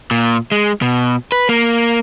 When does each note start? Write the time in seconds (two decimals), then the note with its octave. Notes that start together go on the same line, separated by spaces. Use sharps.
0.11 A#2
0.52 G#3
0.82 B2
1.32 B4
1.49 A#3